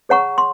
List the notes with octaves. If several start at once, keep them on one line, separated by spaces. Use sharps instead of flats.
G#4 C#5 F#5 A#5 C#6
C6